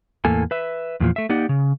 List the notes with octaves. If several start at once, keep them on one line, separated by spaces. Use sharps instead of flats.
E2 A2 A#3 A4 G#5
B4 E5
E2 A#2 F3
A3 E5
A#3 D#4 G4 D5 F#5
C#3